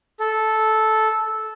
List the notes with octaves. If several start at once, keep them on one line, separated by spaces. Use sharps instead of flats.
A4